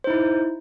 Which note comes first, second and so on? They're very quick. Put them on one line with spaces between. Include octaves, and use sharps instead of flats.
C5 D#4 E4